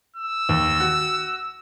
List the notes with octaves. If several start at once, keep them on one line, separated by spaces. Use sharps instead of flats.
E6
D#2
F#4